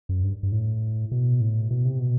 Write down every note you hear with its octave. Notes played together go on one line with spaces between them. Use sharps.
F#2
G2
G2
A2
B2
A2
B2
C3
B2